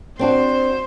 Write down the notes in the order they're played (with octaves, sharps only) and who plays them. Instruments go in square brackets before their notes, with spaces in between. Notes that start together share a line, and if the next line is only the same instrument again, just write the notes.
[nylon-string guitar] C4 D4 F#4 [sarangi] C5